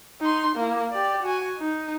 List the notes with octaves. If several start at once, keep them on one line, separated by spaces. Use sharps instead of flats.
D#4 C6
A#3 E4
G4 D5
F#4 G#5
D#4